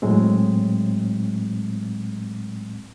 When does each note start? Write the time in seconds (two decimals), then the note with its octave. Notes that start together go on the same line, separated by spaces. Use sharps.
0.02 A2 F#3 G#3 C4